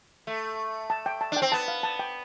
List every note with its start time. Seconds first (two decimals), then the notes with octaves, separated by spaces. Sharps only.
0.27 A3
0.90 A5
1.06 G5
1.21 A5
1.32 D4
1.36 G5
1.42 C4
1.52 B3 A5
1.68 F5
1.83 A5
1.99 G5